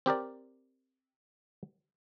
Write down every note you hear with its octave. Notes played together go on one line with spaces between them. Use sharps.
C4 G4 A#4 D5